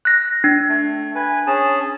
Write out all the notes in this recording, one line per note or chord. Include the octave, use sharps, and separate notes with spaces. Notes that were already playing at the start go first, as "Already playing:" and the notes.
F#6 A#6
D4
A3
B4 G#5
C#4 G#4 A5